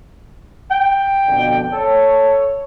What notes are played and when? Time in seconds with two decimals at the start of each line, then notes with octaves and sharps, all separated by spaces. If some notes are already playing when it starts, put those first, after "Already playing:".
0.71 G5
1.26 F2 B2 D3
1.72 A4 C#5